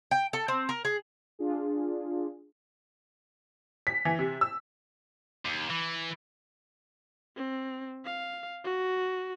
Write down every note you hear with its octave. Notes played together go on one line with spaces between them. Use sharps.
G5
A4
C4
A#4
G#4
D4 F4 G#4
B6
E3
C3
E6
D#2
E3
C4
F5
F#4